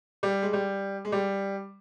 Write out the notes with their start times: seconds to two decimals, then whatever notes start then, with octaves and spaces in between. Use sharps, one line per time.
0.23 G3
0.42 G#3
0.53 G3
1.05 G#3
1.12 G3